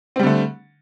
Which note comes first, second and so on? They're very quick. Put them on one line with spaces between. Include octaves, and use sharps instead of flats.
C4 G3 D3 A3